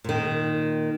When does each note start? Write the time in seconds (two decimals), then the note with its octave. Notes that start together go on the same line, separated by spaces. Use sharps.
0.04 A#2 D#3